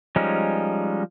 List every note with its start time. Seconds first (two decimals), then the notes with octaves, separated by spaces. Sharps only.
0.16 F3 G3 G#3 C#4 D#4